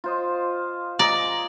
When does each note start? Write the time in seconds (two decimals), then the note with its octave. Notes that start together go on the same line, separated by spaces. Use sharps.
0.04 F4 C5 D#5
0.99 G#4 D5 D#5 A#5